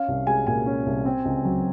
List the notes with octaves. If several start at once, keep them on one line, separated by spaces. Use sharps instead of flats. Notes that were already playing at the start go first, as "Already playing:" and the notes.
Already playing: C#4 F5
C2
G#3 G#5
A#2 G#5
C#4
C2
C4
C#2
F#3